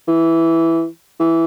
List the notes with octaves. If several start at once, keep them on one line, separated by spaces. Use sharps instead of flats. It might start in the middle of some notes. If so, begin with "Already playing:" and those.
E3
E3